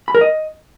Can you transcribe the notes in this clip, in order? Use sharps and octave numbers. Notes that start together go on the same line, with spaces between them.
B5
A#4
D#5